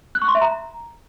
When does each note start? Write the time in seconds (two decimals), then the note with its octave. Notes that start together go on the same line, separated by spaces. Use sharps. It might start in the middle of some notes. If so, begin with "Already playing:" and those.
0.15 F#6
0.22 C#6
0.28 C6
0.35 E5
0.41 A#5